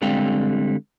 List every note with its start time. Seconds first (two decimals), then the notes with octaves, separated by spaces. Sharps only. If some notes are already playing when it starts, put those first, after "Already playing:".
0.02 D3 G3 G#3 C4 F5 G5